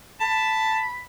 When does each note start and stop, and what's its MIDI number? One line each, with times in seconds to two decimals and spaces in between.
0.20 0.83 81
0.20 1.01 83